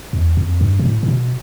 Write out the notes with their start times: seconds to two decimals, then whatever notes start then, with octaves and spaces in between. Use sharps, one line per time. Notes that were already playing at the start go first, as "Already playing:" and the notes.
0.13 E2
0.37 F2
0.61 G2
0.79 B2
0.85 A2
1.03 A2
1.08 B2